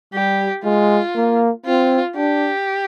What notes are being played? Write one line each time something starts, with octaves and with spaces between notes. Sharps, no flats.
G3 G4
G#3 F4
A#3
C4 F4
D4 G4